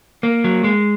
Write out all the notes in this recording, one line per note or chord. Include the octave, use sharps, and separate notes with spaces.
A#3
F#3
G#3